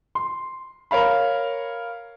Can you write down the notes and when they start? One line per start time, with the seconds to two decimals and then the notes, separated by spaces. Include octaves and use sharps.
0.15 C6
0.91 A#4 C#5 F5 B5